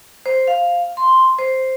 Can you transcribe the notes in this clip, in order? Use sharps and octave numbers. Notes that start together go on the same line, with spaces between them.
C5
F5
C6
C5